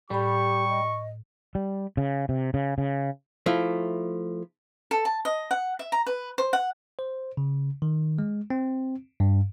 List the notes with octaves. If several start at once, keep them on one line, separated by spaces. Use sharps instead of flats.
A2 G3 G4 B5 C#6
D#5
G3
C#3
C3
C#3
C#3
F3 A3 E4
A4
A5
D#5
F#5
E5
A#5
B4
C5
F#5
C5
C#3
D#3
G#3
C4
G2